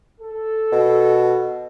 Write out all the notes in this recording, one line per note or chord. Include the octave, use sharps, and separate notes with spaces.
A4
B2